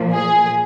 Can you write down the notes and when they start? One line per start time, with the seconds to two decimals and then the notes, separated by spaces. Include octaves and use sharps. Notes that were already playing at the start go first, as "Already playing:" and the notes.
Already playing: A#2 F3
0.13 G#4